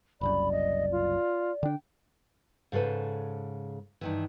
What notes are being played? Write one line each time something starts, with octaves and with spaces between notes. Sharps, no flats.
F#1 C2 F#2 D5 B5
D#5
F4
D3 D4 G5
G#2 C#3 A4 B4 C5
G2 D#3 E3